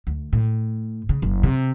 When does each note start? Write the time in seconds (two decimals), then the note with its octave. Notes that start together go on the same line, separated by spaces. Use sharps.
0.07 D2
0.33 A2
1.09 C#3
1.22 F#1
1.43 C3